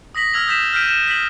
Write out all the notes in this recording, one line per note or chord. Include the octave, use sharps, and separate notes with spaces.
D#6 A#6 B6 F#7
E6 F6 G#6 F7 F#7
D#6 G6 A6 B6 E7
F6 G6 B6 C7 D7 D#7
D#7 E7
B6 F#7